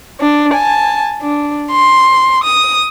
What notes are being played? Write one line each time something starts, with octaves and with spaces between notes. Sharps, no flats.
D4
G#5 A5
D4
C6
D#6